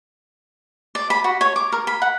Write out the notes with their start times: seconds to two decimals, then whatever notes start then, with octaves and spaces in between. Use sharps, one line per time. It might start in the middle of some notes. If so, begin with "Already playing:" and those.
0.95 D5
1.10 B5
1.24 F#4
1.41 C#5
1.56 D6
1.72 A#4
1.87 B5
2.02 F#5